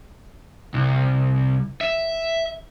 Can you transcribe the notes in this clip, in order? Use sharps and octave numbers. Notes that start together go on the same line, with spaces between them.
C2
E5